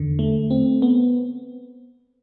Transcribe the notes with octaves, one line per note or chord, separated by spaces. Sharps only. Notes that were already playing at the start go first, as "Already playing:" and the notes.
Already playing: E2 D3
A3
C4
B3